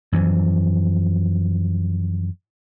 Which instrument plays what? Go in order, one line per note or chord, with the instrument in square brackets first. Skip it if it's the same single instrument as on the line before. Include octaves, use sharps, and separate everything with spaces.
[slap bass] F#2 E3 F3